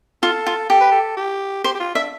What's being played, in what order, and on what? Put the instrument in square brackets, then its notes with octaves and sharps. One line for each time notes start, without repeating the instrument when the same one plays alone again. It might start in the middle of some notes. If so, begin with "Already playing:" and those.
[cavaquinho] F4 [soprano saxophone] A4
[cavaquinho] F4
[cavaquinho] G4 [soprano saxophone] A4
[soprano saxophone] B4
A4
G4
[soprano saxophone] G4 [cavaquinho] C5
[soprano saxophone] G4
F4
[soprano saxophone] D4 [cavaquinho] E5